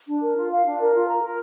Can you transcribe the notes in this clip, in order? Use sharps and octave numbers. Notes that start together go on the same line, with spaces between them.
D4
A#4
F4
F5
D4
A#4
F4
A#5
A#4